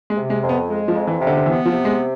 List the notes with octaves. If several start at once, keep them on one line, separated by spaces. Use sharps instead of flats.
G#3
C3
G#3
F2
B3
G#3
F3
F2
E3
C3
D3
D3
E3 B3
F3
C3
G#3